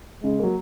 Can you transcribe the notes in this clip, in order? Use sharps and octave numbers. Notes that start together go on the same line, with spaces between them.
C#3 G#3
F#3 A#3